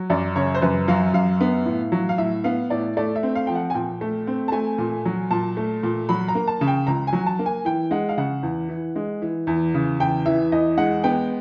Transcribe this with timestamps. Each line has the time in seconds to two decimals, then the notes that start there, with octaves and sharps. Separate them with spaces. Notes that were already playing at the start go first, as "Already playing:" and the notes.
Already playing: F#3
0.10 F#2 D5
0.36 C#3 C#5
0.55 C5
0.62 F#2 B4
0.88 F#3 F5
1.14 F#2 F5
1.41 B3
1.65 A2
1.92 F#3
2.09 F5
2.18 A2 E5
2.44 B3 F5
2.70 A2 D5
2.97 A3 D5
3.16 E5
3.23 C4
3.35 F5
3.47 F3 G5
3.55 F#5
3.70 G#5
3.74 A#2 G5
4.01 A3
4.27 C4
4.48 A5
4.52 A3 G#5
4.78 A#2
5.05 F#3
5.31 A#2 A5
5.57 A3
5.83 A#2
6.09 F#3 B5
6.28 A#5
6.35 A#3
6.47 A5
6.61 C#3
6.68 G5
6.87 C#2 A#5
7.07 G#5
7.13 F#3
7.26 A5
7.39 A#3
7.46 G#5
7.65 E3 G5
7.91 G#3 F#5
8.09 F5
8.17 C#3 F#5
8.43 E2
8.69 E3
8.96 G#3
9.22 E3
9.47 E2
9.74 C#3
10.00 E2 G5
10.26 E3 E5
10.52 E2 D#5
10.77 G#3 F#5
11.04 B3 G5